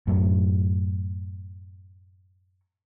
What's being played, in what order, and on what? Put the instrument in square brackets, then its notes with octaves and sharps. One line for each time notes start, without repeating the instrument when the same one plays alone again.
[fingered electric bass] F#2 A2 F#3